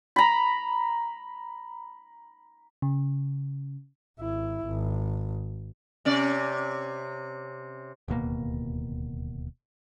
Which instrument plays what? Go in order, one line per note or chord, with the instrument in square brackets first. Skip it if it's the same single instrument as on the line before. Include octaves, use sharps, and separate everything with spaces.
[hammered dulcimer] A#5 B5
[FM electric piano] C#3
[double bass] G#1 E4
G#1
[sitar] C3 C#4 D5
[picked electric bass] D1 D#2 B2 A#3